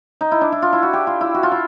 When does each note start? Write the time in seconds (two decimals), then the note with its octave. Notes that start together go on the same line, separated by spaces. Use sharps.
0.21 D#4
0.32 E4
0.41 D4
0.52 E4
0.62 F4
0.73 E4
0.83 F#4
0.93 G4
1.07 F4
1.21 E4
1.34 F#4
1.43 F4
1.52 E4